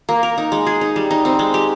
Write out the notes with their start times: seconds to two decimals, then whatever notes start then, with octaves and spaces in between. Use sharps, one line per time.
0.09 A#3
0.23 A#4
0.38 D#4
0.52 G#3
0.67 G#4
0.81 D#4
0.96 G3
1.11 D#4
1.25 C4
1.39 G#3
1.54 G4